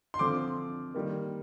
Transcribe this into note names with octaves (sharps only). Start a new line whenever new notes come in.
C6
D3 F3 C4 D6
D#3 G3 A#3